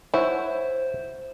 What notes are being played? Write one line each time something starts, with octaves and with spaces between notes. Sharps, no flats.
E4 C5 C#5 E5 F#5